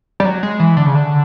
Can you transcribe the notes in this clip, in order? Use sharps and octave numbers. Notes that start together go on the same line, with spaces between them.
G3
F#3
G#3
E3
D3
C#3
D3